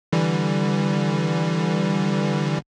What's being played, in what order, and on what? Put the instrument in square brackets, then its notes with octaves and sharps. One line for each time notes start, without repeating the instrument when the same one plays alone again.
[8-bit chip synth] D3 E3 G3